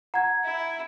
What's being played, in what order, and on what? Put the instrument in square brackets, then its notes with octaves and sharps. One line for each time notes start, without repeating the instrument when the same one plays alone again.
[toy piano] F#5 [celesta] A#5 G#6
[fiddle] E4